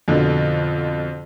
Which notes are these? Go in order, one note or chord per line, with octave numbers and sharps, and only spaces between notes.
F2 B2 D3